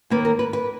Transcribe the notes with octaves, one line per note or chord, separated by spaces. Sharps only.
D#2 D#3 A#3 B4
A#4
B4
B4